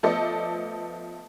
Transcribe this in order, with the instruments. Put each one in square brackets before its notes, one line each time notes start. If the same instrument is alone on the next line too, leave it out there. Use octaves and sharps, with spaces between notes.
[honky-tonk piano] F3 A3 B3 A4 D5 D#5